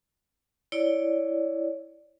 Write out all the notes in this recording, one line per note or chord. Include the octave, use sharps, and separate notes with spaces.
E4 C#5 D5